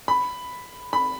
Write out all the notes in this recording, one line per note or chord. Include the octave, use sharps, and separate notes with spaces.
B5
B5